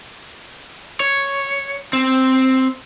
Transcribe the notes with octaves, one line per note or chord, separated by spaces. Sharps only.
C#5
C4